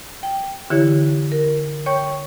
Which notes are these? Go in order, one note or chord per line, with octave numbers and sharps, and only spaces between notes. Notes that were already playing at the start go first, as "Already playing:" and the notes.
G5
D3 E3 E4 G4 C#5
A#4
C#5 G5 C#6 G6